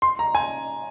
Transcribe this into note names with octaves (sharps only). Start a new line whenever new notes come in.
C6
A#5
G#5